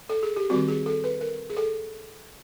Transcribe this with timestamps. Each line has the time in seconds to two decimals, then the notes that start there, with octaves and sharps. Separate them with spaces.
0.09 A4
0.23 G#4
0.36 G4
0.49 D#3 G3 C4 F#4
0.68 G#4
0.86 A4
1.04 B4
1.21 A#4
1.50 G#4
1.57 A4